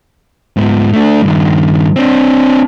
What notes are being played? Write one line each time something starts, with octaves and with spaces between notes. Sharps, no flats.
G#2 B3
A3 D4
G2 D#3
C4 D4